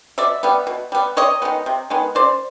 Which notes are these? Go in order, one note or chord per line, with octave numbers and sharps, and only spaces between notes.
B2 D5 E5
G3 B3
B2
G3 B3
C3 C#5 D#5
D#3 G#3 B3
C3
D#3 G#3 B3
C#3 C5 D5